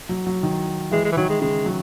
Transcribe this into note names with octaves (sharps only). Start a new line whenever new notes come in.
F#3
F#3
D#3
E3 G#3
G#3
E3
D#3 F#3
G#3
C#3 G#3
F#3